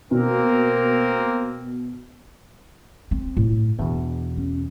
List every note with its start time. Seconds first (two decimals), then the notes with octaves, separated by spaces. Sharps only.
0.11 B2 A#3 C4 A#4
3.11 C4
3.37 A2
3.79 E2 B2 D4
4.37 C#4